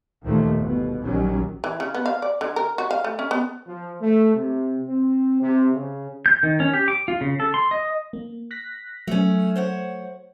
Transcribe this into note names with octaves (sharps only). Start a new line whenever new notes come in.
D#2 A#2 D#3 F3 A3 A#3
G1 B2
A#1 D#3 F#3 G3 C#4
E3
C#3
B3
F5
D5
D3
A#4
F#4
F5
A3
C#4
B3
F3
A3
C3
C4
C3
C#3
G6
D#3
C#4
G4
D6
F4
C#3
A4
C6
D#5
A#3
F#6 A#6 B6
F#3 A3 C#4
C5 C#5 F#5